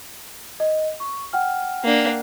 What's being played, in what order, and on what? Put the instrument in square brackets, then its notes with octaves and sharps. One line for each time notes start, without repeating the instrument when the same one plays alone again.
[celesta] D#5
C#6
F#5 G5 F6
[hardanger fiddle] A#3 D4